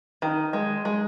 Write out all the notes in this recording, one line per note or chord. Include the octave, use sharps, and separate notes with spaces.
D#3
G#3
G#3